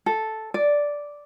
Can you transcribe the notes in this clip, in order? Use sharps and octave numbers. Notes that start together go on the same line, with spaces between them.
A4
D5